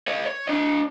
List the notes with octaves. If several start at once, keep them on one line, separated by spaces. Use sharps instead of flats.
C#5 D#5
C#5
D4 D#5